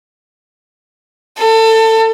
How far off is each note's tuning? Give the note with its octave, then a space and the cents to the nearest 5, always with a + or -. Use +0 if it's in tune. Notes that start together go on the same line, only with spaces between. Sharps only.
A4 +25